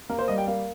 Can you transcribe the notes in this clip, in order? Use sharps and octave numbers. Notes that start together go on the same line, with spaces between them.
A#3 A#4
C5
G3 D#5
G5
A#3 F5